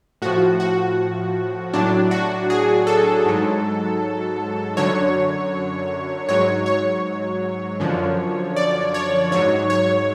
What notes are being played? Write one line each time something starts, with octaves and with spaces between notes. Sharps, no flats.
A2 F3 F#4
F#4
A2 F#3 D4
F#4
G#4
A4
G#2 F#3
F#2 D3 F#3 C#5
G#2 F#3 C#5
C#5
F#2 D3 F3
D5
C#5
G#2 F#3 C#5
C#5